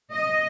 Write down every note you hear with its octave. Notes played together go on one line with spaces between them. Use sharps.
D#5